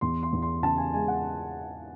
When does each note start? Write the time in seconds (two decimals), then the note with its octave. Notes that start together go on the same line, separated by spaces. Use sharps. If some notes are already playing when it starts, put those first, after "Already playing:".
0.01 E2 C6
0.23 C6
0.33 E2
0.42 C6
0.62 C#3 A5
0.78 G#5
0.93 G#3 G#5
1.08 F#5